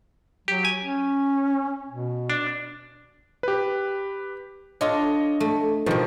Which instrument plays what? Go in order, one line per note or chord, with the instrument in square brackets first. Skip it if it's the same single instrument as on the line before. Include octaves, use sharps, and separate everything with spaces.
[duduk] F#3 [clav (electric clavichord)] G4
[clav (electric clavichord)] G#5
[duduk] C#4
B2
[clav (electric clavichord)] D4
[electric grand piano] G4 B4
[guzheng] D4 F4 A4 [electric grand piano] C#5 D#5
[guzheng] A3
[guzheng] B2 G3 [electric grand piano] D#3 F3